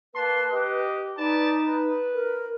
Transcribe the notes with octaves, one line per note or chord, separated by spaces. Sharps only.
A#3 B4 A5 C6
G4 D#5
D#4 B4 D5 A5
B4
A#4